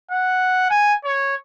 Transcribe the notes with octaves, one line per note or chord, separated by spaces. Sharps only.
F#5
G#5
C#5